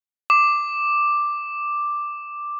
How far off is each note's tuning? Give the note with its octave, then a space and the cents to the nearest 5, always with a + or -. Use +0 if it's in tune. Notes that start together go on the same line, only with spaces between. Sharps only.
D6 +5